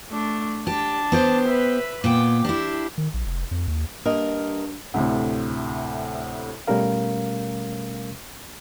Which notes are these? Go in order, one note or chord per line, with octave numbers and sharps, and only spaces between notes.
A3 D4
D4 G4 A5
B3 G4 C5
B4 E5
A#2 B3 G5 D6
D4 E4 G4
D#3
A#1
F1
F2
D#2
G2 A#3 A#4 D#5
D2 A2 C3
B2 G3 A3 C#4 A#4 F5